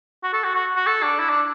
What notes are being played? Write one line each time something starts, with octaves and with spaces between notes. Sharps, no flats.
F#4
A4
F#4
F#4
F#4
A4
D4
E4
D4